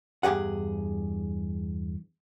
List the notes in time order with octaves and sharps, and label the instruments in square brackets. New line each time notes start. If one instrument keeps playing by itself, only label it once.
[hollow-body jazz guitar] E2 G2 G4 G#4 F#5